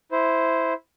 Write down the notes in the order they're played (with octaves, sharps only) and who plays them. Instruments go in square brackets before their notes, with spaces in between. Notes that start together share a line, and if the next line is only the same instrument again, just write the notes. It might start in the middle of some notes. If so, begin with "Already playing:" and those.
[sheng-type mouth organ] E4 C5